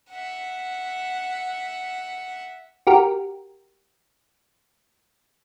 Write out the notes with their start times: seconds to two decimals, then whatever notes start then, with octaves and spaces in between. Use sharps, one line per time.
0.10 E5 F#5
2.87 F#4 G4 A#4